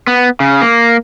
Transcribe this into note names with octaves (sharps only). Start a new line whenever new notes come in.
B3
C#3
A#3